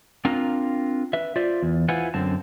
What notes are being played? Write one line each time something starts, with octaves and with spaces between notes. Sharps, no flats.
C4 D4 F4 A#4 A#5
B4 E5
F4 C5 D5 E5
E2
E4 F4 B4 C5 F#5 G#5
F#2 D3 C4 A5